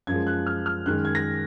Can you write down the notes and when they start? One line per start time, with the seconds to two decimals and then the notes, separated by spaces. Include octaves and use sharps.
0.07 F#2 F3 G#3 G#6
0.27 F#6
0.47 F6
0.66 F6
0.86 F#2 D#3 G#3 F#6
1.05 G#6
1.15 A#6